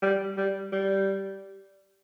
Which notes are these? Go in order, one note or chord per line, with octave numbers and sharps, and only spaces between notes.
G3
G3
G3